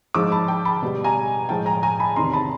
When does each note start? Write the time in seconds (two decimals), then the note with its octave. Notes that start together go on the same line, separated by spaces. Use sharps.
0.15 G#2 F3 G#3 D6 E6
0.32 A5 B5
0.48 G5 A5
0.65 A5 B5
0.82 B2 G3
1.04 G#5 A#5
1.49 A2 F3 G#3 G5 A5
1.66 G#5 A#5
1.83 G#5 A#5
2.00 A5 B5
2.16 E2 C3 D#3 A#5 C6
2.33 A5 B5